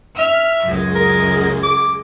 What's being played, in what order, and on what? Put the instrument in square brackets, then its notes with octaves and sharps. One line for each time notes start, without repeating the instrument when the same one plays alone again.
[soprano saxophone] E5 [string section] F6
[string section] C#2 F#2 G#3
[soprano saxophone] A#4
D6